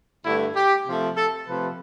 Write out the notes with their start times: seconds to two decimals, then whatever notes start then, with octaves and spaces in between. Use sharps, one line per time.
0.25 G2 D3 A3 E4
0.56 G4
0.87 C3 F3 A3
1.17 A4
1.48 C3 F3 A3 B4